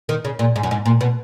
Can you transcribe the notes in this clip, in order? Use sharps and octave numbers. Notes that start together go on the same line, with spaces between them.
D#3
C#3
A#2
G#2
F#2
G#2
A#2
B2